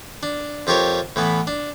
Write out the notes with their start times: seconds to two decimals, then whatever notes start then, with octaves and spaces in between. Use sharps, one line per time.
0.23 D4
0.67 F2 F4 G4 A#4 C#5
1.16 A2 E3 B3
1.47 D4